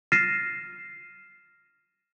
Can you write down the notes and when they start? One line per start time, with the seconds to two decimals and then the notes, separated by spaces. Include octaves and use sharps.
0.12 F6 A6 A#6 C7 D#7 E7